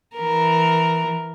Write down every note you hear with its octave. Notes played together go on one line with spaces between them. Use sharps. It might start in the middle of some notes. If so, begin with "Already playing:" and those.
E3 A#4